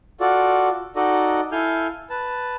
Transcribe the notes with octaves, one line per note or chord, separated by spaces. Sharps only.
F4 F#4 A4 D5
D#4 F#4 A4 D5 D#5
E4 A4 F5 G#5 F6 G6
B4 A5